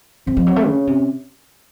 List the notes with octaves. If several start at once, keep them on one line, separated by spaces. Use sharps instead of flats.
C#3 C4
F3
F#3
A3
C#3 C#4
C3